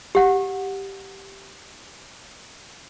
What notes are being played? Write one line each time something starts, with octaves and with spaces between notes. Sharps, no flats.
G4 F#5